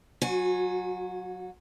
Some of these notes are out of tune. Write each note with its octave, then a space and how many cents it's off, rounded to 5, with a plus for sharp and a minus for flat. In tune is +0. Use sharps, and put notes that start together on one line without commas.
F#3 +0 F#4 -35 G#5 +0